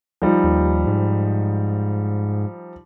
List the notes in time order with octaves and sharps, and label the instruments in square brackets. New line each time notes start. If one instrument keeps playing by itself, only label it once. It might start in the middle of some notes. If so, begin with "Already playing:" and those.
[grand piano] F3 G3 D#4
[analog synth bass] D#2
G#2